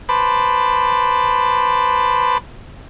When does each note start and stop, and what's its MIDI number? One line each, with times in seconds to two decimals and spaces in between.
0.09 2.38 71
0.09 2.38 72
0.09 2.38 81
0.09 2.38 83
0.09 2.38 86